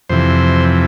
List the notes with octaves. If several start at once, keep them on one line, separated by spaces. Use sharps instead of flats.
F2 C3 E3 C5